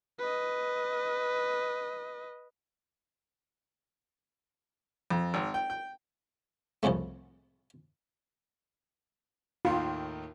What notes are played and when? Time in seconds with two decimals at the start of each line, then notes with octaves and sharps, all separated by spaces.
0.19 B4 D#5
5.10 F2
5.34 G#1
5.54 G5
5.70 G5
6.83 C2 F2 A2 C#3 A3
9.65 D#2 A2 D#3 F4